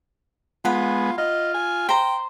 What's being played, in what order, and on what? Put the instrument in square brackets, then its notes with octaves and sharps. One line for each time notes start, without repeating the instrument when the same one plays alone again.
[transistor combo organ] G#3 B3 [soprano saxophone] F4 [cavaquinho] F#5 B5
[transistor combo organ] F4 [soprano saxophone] D#5
[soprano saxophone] G#5
[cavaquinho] C5 A#5 [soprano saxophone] G5